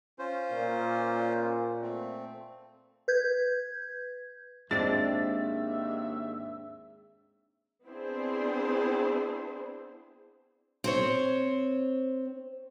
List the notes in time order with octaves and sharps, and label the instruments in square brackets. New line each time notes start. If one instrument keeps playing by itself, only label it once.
[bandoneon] C#4 F4 C5
[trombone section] A#2
[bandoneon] A3 C4
[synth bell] B4 G6 G#6
[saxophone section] D#2 G#2 E5 [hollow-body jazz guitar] G#3 C4 [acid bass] D4 [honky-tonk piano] A6
[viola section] B3 C4 D4 E4 G#4 C5
[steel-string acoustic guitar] C4 C5 C#5